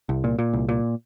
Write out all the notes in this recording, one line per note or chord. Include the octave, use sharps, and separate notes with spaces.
C2
A#2
A#2
C2
A#2